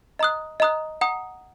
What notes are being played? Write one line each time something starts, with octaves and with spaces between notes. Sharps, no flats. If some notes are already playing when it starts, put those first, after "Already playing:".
D#5 A#5 D#6 F#6
D#5 A#5 D#6 F#6
F#5 A#5 D#6